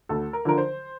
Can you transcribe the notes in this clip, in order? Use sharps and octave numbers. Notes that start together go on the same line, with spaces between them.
D2 A4
A#4
D3 F3 A#4
C5